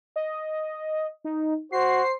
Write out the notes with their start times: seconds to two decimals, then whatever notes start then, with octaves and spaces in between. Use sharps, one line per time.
0.16 D#5
1.24 D#4
1.72 F#4 C5 C7